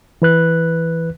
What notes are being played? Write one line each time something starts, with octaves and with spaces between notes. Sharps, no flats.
E3 B4 F#6